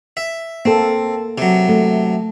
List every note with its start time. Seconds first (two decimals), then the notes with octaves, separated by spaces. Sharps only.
0.17 E5
0.65 A#3 C4 A4
1.38 C3 F#3
1.69 A3